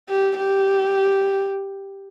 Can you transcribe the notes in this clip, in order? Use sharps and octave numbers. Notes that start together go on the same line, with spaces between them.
G4
G4